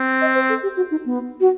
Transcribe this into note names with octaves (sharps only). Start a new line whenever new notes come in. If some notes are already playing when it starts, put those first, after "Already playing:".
Already playing: C4
D#5
C5
A4
G4
F#4
D#4
B3
F#4